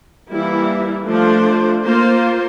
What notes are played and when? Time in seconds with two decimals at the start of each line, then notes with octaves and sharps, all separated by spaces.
0.31 E3 G3 A#3 E4
1.06 F3 A3 D4 F4 C5
1.82 A#3 F4 C5